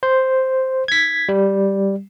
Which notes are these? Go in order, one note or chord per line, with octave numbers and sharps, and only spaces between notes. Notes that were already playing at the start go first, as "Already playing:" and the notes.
C5
G#6 B6
G3